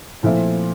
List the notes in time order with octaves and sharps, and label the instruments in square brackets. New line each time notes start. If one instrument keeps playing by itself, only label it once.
[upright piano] A#2 F3 A3 C4 E4